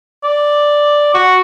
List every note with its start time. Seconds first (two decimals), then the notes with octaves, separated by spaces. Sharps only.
0.24 D5
1.14 F#4